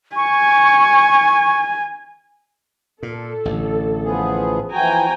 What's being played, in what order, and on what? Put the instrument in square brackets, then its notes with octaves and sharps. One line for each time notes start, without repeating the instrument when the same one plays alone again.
[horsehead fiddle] G#5 [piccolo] C#6
[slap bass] A#2 [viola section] A4
[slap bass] A1 A2 D3
[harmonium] F3 B3 G#4
[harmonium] E3 F3 F#4 [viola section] G5 G#5 A#5